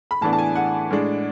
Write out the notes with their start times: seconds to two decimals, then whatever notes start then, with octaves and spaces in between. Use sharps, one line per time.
0.11 B5
0.21 A2 E3 B3 D4 A5
0.33 A5
0.39 G#5
0.55 F#5
0.91 A2 G#3 D4